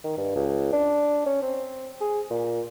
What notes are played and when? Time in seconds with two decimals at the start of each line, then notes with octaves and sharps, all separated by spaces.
0.04 D#3
0.17 G2
0.35 C#2
0.72 D4
1.26 C#4
1.42 C4
2.01 G#4
2.30 A#2